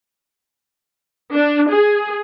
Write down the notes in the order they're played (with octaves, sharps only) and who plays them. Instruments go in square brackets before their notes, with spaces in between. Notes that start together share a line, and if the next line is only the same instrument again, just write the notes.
[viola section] D4
G#4